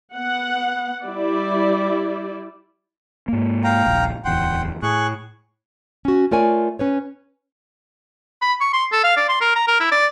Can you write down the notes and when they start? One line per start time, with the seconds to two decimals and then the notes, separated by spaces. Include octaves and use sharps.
0.14 B3 F#5
1.03 G3 E4 D5
3.28 G#2 A#3
3.64 F5 G5 A#5
3.86 D#1 A#1
4.25 D1 E2 F#5 G5 C6
4.82 A2 G#4 C#6 F#6
6.05 C#4 F#4
6.31 A3 F4 A#4 C#5 D5 G#5
6.79 C#4 B4 C#5
8.42 B5
8.61 C#6
8.73 C6
8.92 A4
9.04 F5
9.17 D5
9.29 C6
9.41 A#4
9.55 A#5
9.67 A#4
9.80 E4
9.92 D5